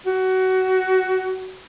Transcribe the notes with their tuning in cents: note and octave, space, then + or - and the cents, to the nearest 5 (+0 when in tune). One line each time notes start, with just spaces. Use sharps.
F#4 +20